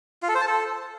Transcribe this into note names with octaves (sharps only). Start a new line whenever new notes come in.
F4
A4
C5
A5
A4